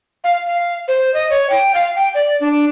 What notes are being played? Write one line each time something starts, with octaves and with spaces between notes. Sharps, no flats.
F5
F5
C5
D#5
C#5
G5
F5
G5
D5
D4